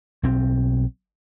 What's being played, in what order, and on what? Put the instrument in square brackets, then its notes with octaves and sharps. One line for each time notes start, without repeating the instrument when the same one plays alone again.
[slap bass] B1 C4